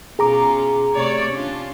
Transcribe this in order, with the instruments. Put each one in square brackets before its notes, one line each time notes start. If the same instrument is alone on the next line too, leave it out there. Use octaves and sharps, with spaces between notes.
[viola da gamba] B2 C#4 F4 [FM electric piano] G#4 A#5 D6
[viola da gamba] C3 A3 [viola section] C#5 D5
[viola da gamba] C#4 F4 [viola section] D4